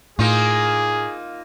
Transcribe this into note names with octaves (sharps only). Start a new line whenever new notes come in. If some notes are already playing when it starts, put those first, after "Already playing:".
A2 A#3 D#4 F4 G#4